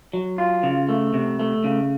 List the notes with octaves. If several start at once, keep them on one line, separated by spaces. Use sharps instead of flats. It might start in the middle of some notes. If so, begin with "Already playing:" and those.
F#3
F4
C#3
A3
C3
A3
C#3